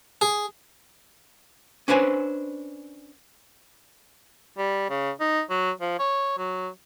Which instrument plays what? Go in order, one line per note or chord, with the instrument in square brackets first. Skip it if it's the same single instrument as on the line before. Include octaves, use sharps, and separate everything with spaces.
[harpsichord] G#4
[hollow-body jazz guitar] C#4 D4 B4 C5 G#5
[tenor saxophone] G3
C#3
D#4
F#3
F3
C#5
F#3